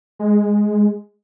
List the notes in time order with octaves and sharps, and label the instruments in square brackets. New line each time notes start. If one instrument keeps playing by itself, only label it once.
[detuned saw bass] G#3